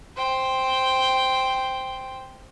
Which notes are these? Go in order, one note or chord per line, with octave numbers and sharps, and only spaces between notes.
C5 G5